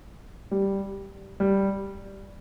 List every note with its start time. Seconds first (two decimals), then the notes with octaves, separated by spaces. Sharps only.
0.51 G3
1.40 G3